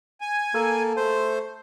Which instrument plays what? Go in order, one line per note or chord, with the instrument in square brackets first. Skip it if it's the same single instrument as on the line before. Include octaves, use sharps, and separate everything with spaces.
[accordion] G#5
[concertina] A#3 [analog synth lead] A4
[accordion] A3 [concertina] C5